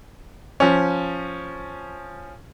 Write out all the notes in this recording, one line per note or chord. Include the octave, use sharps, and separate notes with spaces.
F3 C#4